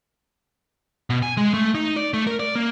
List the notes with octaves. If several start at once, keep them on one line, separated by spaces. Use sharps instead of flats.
B2
G#5
G#3
A3
D#4
D5
A3
A#4
D5
A#3